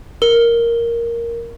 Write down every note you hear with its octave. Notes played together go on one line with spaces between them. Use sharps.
A#4 G7